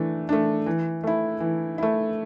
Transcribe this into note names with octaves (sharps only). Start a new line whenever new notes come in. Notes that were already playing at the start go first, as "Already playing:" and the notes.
Already playing: E3 A3 D4
A3 D4
E3
A3 E4
E3
A3 E4